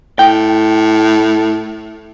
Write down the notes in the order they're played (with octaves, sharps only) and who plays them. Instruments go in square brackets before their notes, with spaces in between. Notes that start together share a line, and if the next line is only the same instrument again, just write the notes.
[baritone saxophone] A2 [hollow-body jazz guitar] G5